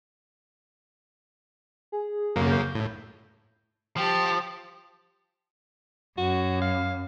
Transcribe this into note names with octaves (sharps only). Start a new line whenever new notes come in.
G#4
F#2 C#3 A#3
G6
A2
F3 G4 A5
F#2 F#4
F5